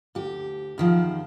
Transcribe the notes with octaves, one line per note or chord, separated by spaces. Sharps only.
D2 G4
E2 D#3 F3